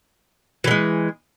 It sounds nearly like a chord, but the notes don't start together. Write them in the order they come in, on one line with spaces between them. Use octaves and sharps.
E3 D3 G#3